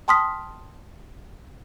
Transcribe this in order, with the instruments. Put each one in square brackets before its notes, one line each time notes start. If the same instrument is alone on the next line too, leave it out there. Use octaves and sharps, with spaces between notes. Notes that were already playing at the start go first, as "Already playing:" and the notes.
[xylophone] G5 A5 C6 D#6 F6 B6